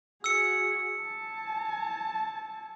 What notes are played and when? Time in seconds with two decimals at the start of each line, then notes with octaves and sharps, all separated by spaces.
0.24 F#4 G#4 E6 C#7
1.01 G#5 A5